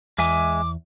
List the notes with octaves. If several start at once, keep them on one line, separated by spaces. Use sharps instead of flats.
E2 G#3 E5 G#5 D6